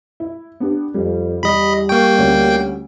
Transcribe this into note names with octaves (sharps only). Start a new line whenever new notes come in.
E4
B3 D4 G4
F2 G3
E2 G3 D#5 B5
A#3 G5 C#6
D2 C#4